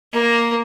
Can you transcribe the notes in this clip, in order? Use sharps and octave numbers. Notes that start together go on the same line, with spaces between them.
A#3